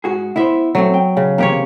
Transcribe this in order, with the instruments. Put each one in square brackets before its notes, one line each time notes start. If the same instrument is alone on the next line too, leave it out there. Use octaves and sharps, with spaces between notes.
[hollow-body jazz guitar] G#2 F#4 G#4
[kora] B3 E5 [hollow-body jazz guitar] E4 C5
[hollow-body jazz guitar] F#2 A3 C4 [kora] F#3
[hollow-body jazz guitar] G5
[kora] C#3
[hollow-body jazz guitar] E2 C3 F3 [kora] A#3 G4 C#5